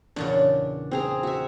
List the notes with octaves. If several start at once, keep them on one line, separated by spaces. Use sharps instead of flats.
E2 A#2 C#3 D4
C4 G#4 A#5
F#4 E5